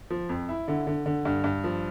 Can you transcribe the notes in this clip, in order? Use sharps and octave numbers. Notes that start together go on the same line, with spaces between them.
F3
F2
E4
D3
D3
D3
G2
G2
F3